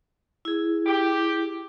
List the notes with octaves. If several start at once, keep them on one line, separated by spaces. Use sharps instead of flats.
E4 G#4
G4